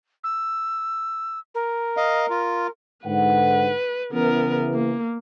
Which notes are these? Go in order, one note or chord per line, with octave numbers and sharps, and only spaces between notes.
E6
A#4
D#5 F5
F4
G#2 D3 B4 F#5
C#3 E3 B3 A#4
A#3